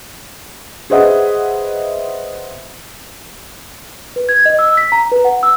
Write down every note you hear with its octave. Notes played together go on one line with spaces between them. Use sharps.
G#4 B4 C5 D#5 E5 F#5
B4
G#6
D#5
E6
B6
A#5
B4
F#5
E6